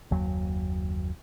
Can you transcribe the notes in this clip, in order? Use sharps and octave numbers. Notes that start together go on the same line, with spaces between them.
F#1 D#2 F#3